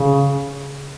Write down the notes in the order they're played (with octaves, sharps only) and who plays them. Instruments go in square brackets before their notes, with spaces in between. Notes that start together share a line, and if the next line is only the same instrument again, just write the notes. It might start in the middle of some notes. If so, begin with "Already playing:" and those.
Already playing: [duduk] C#3